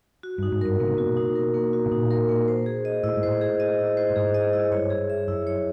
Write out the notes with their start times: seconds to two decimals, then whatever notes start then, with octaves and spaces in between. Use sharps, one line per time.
0.23 F#4
0.38 G2 D#4
0.52 G#2
0.61 G2 A#4
0.80 B2 A#3
0.88 C3
0.97 B2 F#4
1.17 D#4
1.36 A#4
1.54 A#3
1.73 F#4
1.86 B2
1.91 A#2 D#4
2.11 A#4
2.29 A#3
2.48 C5
2.66 G#4
2.85 D#5
3.03 A2 E4
3.16 G#2
3.23 A2 C5
3.41 G#4
3.60 D#5
3.79 E4
3.97 C5
4.10 A2
4.16 G#2 G#4
4.34 D#5
4.53 E4
4.71 G2 C#5
4.90 G#4
5.10 E5
5.27 F#2 E4
5.47 C#5